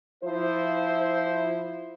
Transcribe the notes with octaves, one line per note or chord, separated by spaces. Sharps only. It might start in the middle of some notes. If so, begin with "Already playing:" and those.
F3 E4 C5